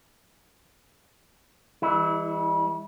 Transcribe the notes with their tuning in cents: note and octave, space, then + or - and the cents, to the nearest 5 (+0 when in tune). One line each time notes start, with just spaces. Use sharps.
E3 +0 G3 +45 E4 -30